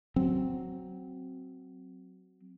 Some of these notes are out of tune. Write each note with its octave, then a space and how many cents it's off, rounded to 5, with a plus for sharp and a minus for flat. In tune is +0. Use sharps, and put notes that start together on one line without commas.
F#3 +10 C4 +0